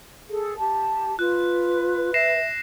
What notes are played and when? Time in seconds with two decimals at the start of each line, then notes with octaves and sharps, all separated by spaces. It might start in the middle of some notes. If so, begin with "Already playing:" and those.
0.28 G#4 A4
0.57 G4 A5
1.19 F4 B4 F#6
2.14 E5 A#6 C7 E7